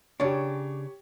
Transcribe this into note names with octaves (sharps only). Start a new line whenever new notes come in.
C#3 D4 G4 C#5